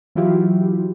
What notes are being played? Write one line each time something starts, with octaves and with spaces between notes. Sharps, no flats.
E3 F#3 E4 F4 G4